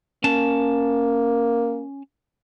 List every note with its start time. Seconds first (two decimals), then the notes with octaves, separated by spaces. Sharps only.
0.24 A#3 C#4 A5